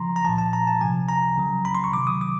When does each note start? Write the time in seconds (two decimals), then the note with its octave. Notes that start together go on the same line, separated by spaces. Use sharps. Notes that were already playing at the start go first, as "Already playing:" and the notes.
Already playing: C#3 F3 A#5 C6
0.16 A#5
0.25 A#2 F3 A5
0.38 A5
0.53 A#5
0.67 A5
0.81 C3 F3 G#5
1.09 A#5
1.38 C#3 F#3
1.65 B5
1.74 C6
1.84 C#6
1.93 C3 D#3 F#3 D6
2.07 D#6
2.21 D6